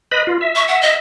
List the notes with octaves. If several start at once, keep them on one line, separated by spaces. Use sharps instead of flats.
B4 D#5 B5
F4
E5
C#6
F#5
D#5